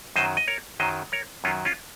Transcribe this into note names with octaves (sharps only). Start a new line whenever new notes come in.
F#2 D#3 F#3 C5 D#5
D#5
A#4 C#5
F#2 D#3 F#3 C5 D#5
A#4 C#5
F#2 D#3 F#3 C#4 F4
C#4 F4